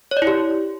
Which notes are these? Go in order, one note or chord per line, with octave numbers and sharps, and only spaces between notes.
C#5
D5
E4
G4